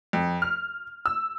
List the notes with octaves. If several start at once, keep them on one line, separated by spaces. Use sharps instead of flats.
F2
F6
E6